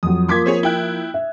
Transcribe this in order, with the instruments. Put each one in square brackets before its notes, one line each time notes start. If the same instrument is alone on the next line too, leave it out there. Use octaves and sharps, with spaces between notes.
[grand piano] F2 F#3 [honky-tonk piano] D#6
[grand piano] F3 A#3 G#6 [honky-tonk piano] C6 D6 B6
[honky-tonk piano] C4 G#4 C#5
E4 G5 F#6
[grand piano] E5